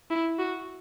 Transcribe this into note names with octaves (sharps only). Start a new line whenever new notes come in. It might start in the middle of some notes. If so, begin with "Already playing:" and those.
E4
F#4